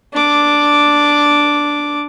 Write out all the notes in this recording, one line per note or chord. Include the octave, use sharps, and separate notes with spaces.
D4 D6